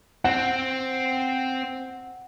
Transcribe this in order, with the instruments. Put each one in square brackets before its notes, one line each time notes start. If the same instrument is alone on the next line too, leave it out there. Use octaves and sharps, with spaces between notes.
[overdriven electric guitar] C4 [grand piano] F#5